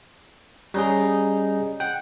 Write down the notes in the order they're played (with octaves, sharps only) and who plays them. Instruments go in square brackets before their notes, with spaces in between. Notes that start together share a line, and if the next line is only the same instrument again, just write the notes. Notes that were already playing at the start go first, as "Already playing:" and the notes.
[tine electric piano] G3 C#4 G#4 [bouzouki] D#4
[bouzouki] F#5 [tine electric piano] G5